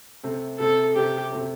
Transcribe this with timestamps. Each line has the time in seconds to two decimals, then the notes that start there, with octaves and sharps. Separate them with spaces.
0.23 C3 A3 C4
0.59 C3 A3 C4 A4
0.95 C3 A3 C4 G4
1.31 C3 A3 C4